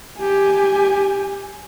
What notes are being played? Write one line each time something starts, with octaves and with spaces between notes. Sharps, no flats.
G4 G#5